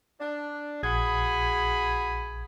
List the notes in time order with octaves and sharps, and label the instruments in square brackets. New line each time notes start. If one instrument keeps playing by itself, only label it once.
[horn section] D4
[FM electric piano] A#1 G#6 [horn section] F#4 G#4 B5